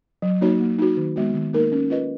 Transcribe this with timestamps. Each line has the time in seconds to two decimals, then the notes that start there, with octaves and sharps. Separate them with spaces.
0.22 F#3
0.41 A#3 D#4 F#4 C#5
0.60 A#3
0.79 D#4 F#4
0.97 D#3
1.16 G#3 B3 F#4
1.34 D#3
1.53 A#3 D#4 A#4
1.72 C#4
1.90 F4 B4 D#5